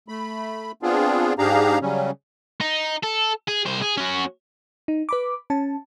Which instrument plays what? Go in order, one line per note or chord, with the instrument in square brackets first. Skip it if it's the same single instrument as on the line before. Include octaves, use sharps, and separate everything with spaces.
[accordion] A3 B5
B3 C4 D4 F4 G#4
G#2 D4 G4 G#4 F5 A#5
C#3 F#3 G3 C#4
[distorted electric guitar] D#4
A4
G#4
C2 C5
G#4
C#4 F#4
[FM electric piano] D#4
B4 B5 D6
C#4 A5